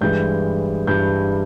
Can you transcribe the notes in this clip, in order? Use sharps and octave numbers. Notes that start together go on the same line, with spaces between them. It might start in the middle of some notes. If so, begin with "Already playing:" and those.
G2 E3 G#3 G6
G2 E3 G#3 G6